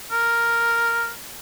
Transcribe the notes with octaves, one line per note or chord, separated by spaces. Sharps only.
A#4